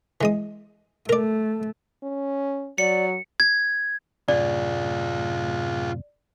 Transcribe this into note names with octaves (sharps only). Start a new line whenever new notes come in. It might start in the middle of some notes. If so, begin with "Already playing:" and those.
E3 G#3 D#6
A3 A#4 D5
C#4
F#3 D5 C#7
G#6
F#2 A2 C3 F4 G#4 D5